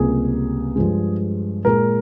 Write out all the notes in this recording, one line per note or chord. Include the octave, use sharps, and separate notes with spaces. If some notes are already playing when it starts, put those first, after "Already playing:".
Already playing: C#2 C3 G3 A#3 G#4
G2 F3 G#3
A#2 G#3 A#4